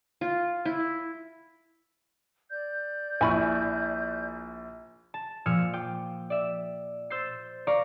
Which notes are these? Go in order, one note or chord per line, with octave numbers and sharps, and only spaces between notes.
F4
E4
D5 G6
A#1 E4 G#5 B5 C#6
A5
A#2 F3 E6 F6 G#6 C#7
F4 G5 D6
D5 E5
C5 E6 G6 A6 C7
D5 F5 A#5 C#6